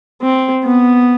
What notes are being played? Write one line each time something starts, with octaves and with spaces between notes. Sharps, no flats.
C4
B3